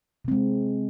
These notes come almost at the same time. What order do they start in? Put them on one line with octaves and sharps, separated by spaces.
C3 C4 G#3